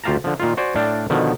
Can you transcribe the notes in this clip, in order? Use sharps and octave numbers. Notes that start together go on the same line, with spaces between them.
D2 F4 G4 F5 A5 A#5
D3 F3
A#2 D#3 F4
F#4 C5 D5 G#5
A2 D4 D5 F5 G5
B2 D3 D#3 F3